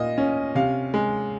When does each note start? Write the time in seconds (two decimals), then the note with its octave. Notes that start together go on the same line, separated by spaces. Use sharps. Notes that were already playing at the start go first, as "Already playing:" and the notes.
Already playing: A#2 D#5
0.18 C#4
0.55 C3 F5
0.94 G#3